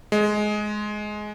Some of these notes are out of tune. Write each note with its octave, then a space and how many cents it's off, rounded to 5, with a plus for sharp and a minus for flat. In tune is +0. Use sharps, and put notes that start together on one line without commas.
G#3 +15